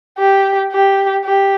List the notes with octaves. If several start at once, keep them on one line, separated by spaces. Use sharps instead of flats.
G4
G4
G4